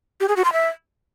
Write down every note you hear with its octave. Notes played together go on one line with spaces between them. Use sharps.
G4
G#4
F#4
C6
E5